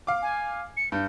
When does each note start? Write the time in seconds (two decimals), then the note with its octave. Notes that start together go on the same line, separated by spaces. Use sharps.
0.07 F5 D6
0.22 G#5
0.77 C#7
0.92 G2 G6